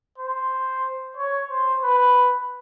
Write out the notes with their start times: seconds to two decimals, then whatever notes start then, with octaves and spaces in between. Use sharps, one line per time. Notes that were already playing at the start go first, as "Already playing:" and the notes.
0.18 C5
1.17 C#5
1.50 C5
1.83 B4